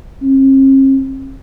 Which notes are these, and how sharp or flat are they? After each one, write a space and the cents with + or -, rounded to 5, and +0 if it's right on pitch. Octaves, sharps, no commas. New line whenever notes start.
C4 +45